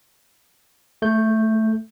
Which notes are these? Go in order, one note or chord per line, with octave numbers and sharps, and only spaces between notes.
A3 G6